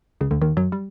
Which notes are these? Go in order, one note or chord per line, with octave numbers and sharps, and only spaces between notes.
C#2 C#3
D2 D3
D#2 D#3
F#2 F#3
G3